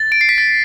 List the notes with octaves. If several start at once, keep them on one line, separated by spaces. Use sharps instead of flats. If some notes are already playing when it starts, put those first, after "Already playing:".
Already playing: A6
D7
C7
B6
A6